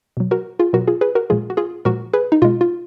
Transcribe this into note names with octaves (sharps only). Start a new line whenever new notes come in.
B2 F#3
F#4 A#4
F4 G#4
B2 F#3 F#4 A#4
F4 G#4
G#4 B4
F#4 A#4
A#2 F3 G#3 F4 G#4
F#4
F4 G#4
A#2 F3 G#3 F#4 A#4
G#4 B4
D#4
B2 G#3 F4
F4